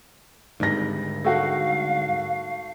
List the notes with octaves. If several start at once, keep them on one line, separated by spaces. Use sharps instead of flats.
G#1 D2 G#2 G3 A#6
A3 F#4 F5